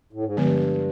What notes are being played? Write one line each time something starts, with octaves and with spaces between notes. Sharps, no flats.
A2
G#2
G2 D3 F3 G#3 B3